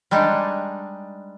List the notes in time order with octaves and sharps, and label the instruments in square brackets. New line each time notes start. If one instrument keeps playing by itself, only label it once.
[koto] G3 G#3 D4 D#4